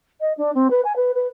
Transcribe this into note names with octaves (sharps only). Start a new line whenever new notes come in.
D#5
D4
C4
B4
G#5
B4
B4